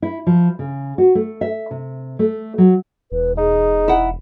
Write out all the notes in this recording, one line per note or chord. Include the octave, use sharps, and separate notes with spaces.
E4
F3
C#3
F#4
A3
E5
C3
A3
F#3
E1 B4
D#4 G#4
E4 F#5